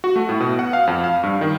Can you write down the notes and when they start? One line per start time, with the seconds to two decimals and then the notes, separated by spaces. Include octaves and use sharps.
0.04 F#4
0.16 A3
0.29 A2
0.40 B2
0.59 F#5
0.73 F5
0.87 F2
1.04 F5
1.23 G2
1.41 D#3